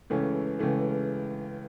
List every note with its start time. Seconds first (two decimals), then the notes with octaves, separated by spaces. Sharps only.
0.10 C#2 C#3 E3 A3 C#4
0.59 C#2 C#3 E3 A3 C#4